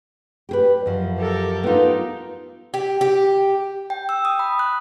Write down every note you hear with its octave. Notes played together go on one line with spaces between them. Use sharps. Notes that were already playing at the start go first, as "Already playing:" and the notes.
G4 G#4 B4
F#2 F3
G4 A4 A#4
B3 D#4 F4 G4
G4
G4
G5
E6
D#6
B5
F#6